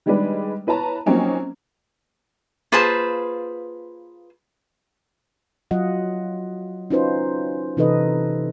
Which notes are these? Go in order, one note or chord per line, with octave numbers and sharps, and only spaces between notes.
D#3 G3 G#3 D4 B4
E4 B4 C#5 A5 A#5
F3 F#3 A#3 C4 C#4 D#4
A#3 F4 G#4 B4 C5 A5
F#3 F4 D#5 F#5
C#4 D#4 F4 F#4 B4 C5
C3 E3 D#4 A4 B4 D#5